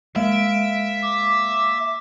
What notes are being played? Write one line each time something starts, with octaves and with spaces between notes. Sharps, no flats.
G#3 A#3 E5 F5 D7
D6